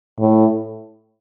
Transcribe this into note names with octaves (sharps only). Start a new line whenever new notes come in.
A2